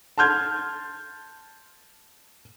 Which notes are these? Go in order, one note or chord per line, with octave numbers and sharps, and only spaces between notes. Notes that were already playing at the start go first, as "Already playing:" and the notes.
A5 C6 F6 G6 G#6